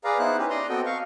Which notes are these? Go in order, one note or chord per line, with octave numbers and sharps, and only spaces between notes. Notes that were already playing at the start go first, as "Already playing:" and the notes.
G#4 B4 D5 F5 A#5
B3 D#4 E4 C5 F#6
C#4 G4 B4
D5 D#5 A#5 C6
B3 C4 F#4 A4 D#5 G5
F5 C#6